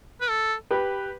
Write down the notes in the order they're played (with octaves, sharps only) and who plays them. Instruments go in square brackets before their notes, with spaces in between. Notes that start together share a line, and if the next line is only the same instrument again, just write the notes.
[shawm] B4
A4
[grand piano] G4 B4